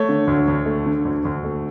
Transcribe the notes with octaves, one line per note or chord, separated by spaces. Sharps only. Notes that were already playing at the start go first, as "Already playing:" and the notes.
Already playing: A3 C#5
D3
D2
D2
A3
D3
D2
D2
A3